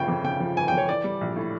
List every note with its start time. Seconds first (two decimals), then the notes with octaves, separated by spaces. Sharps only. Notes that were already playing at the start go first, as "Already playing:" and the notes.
Already playing: G1 C#3 F3 G5
0.08 F2
0.24 C#3 G5
0.40 F3
0.56 G1 G#5
0.68 F2 G5
0.77 C#5
0.89 E3 D5
1.04 G3
1.21 A#1
1.36 A2